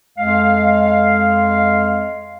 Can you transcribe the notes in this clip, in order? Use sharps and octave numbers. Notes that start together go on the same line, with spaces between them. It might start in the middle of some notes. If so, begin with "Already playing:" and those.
F2 G#3 F5